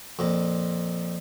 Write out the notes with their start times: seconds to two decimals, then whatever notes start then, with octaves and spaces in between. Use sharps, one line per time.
0.19 F2 A#2